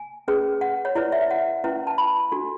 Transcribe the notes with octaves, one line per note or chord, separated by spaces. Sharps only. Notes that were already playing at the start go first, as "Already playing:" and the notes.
Already playing: G#5
C#4 G#4 B4
F#5
C#5
E4 B4 D5
E5
F#5
C#4 E4 B4
A5
B5
D4 F#4 A4